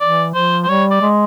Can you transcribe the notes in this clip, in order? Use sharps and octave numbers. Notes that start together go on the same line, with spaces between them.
E3 D5
F3 C5
C5
G3 C#5
D5
G#3